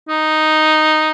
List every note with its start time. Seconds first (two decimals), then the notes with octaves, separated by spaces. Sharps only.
0.09 D#4